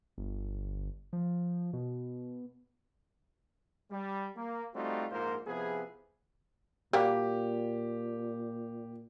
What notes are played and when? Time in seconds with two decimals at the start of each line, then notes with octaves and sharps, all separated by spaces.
0.18 G1
1.13 F3
1.73 B2
3.91 G3
4.36 A#3
4.75 G3 A3 C4 D#4 F4 F#4
5.11 A#1 G#2 A#3 F4 A#4 C5
5.47 C3 F3 B3 E4 G#4
6.93 A#2 G3 A#3 F#4 G4